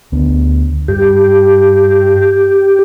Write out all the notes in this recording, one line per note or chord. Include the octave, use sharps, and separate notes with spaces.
D2 B3 D4
G2 G4